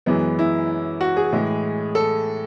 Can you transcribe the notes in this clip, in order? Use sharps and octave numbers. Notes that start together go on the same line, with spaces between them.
F#2 E3 G#3 B3
E4
F#4
G#4
A2 E3 G#3
A4